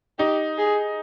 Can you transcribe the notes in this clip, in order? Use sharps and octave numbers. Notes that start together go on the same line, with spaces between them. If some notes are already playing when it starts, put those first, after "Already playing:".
D#4 G4
G#4